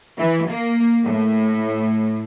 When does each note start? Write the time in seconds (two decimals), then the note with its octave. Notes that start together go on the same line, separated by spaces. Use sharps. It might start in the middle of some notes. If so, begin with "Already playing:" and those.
0.18 E3
0.48 A#3
1.04 A2